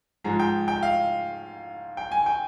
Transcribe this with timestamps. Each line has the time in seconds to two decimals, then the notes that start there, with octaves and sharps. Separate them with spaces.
0.24 G#2 F3 G#3 A#5
0.40 G5
0.68 G5
0.83 F5
1.97 G5
2.12 G#5
2.26 G5